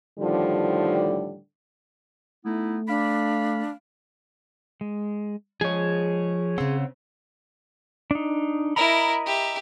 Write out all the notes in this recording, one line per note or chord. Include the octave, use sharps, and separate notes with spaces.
A2 D3 D#3 F3 G3
A3 B3 D#4 E4
D4 F5 B5
G#3
F3 G#3 G#4 C#5
C#3 C4 F#5 C6 E6
D4 D#4
E4 A#4 D#5 A#5 B5
G4 E5